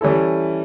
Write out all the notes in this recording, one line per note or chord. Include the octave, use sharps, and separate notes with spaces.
E3 G3 C#4 E4 A4